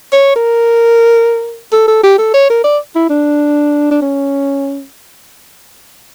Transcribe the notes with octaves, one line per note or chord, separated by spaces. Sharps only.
C#5
A#4
A4
A4
G4
A4
C#5
A#4
D5
E4
D4
D4
C#4